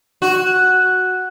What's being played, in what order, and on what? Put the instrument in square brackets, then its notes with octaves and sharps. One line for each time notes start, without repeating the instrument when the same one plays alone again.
[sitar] F#4